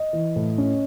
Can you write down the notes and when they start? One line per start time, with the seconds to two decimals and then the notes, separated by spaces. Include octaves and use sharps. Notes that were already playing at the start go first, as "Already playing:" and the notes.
Already playing: D#5
0.13 E3
0.36 A2
0.58 C#4